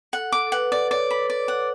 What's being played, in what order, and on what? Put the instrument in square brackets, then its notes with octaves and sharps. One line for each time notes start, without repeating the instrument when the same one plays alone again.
[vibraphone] A4 [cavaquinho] F#5
[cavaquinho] D6
[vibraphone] A4
[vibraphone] B4 [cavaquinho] F#5
[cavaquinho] D5
[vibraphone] C#5 [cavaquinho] D5
[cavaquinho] B5
D5
F#5